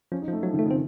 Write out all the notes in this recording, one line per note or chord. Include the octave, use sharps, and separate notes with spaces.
F3 C#4
D#4
F3
A3
F3 F#3
D#3
A3
C#3
C4